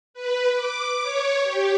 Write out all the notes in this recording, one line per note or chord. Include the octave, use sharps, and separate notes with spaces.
B4
D6
C#5
G4